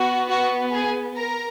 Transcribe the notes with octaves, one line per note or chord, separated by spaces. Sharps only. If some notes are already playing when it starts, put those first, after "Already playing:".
Already playing: B3 F#4
F#4 F#5
G#4 G#5
A#4 A#5